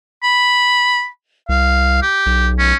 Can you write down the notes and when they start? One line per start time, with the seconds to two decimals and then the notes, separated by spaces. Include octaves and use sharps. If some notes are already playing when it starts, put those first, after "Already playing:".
0.23 B5
1.49 C2 F5
2.02 G4
2.26 B1
2.59 C#4